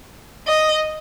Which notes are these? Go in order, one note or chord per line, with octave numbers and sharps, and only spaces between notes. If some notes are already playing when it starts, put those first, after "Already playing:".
D#5